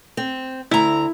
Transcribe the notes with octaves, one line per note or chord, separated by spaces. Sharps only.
C4
D2 E4 A#5